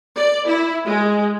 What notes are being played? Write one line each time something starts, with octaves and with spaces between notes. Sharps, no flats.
D5
E4
G#3